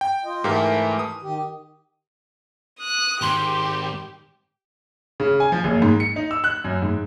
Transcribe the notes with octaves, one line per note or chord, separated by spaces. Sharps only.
G5
F4 D#5
G#2 E3 A3 G4 A#4
D#6
D#3 G4
D#6 F#6
G#2 D#3 G4 C6
C#3
G#5
F3
F#1
G#2
C#7
D#4
E6
F#6
F#2
G#2